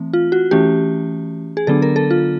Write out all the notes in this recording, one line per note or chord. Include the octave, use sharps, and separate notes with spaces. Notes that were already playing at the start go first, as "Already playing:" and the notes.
Already playing: E3 A3 C4
F4
F#4
E3 A3 C#4 G4
G#4
D3 F#3 B3 D4 A4
A#4
A4
F4